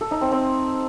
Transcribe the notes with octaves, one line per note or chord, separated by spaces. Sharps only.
A4
D#4
C4
C4